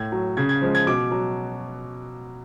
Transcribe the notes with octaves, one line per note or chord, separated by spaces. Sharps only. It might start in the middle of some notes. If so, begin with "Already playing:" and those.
Already playing: A2 G#6
F#3
C#3 G#6
G#6
F3 G#3
G#6
B2 D6
F#3